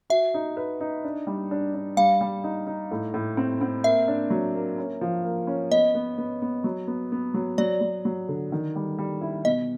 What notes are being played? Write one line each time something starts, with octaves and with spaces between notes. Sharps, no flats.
F#4 E5
D#4
B4
D#4
D4
G3
D4
D4
G3 F5
G3
D#4
D#4
A2
A2
C4
C4
A#3 E5
D4
F#3
A#3
C#4
F3
A#3
C#4
B3 D#5
B3
B3
B3
F#3
B3
B3
F#3
F#3 D5
F#3
F#3
D3
D#3
G3
G3
E4
B2 D#5